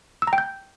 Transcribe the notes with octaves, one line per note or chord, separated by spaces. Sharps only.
E6
A#5
G5
G6